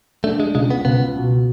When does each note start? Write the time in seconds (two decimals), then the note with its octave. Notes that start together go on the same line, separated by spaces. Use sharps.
0.24 A3 D4
0.40 G#3
0.55 C#2 G#3
0.70 B3
0.85 C#2 B3
1.16 B2